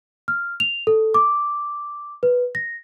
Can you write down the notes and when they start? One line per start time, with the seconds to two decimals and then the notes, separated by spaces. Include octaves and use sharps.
0.28 F6
0.60 F7
0.87 A4
1.14 D6
2.23 B4
2.55 A#6